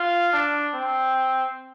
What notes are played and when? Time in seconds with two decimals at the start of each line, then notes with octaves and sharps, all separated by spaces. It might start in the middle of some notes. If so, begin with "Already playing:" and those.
Already playing: F4
0.33 D4
0.74 C4